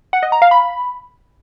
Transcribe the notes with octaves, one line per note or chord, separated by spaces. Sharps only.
F#5
D#5
A#5
F5
B5